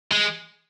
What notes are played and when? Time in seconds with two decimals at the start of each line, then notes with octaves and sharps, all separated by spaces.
0.12 G#3